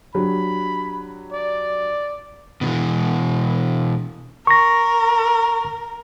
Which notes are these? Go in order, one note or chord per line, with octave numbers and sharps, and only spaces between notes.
F#3 D4 G4 B5
D5
B2 D#3 E3
A#4 C#6 A#6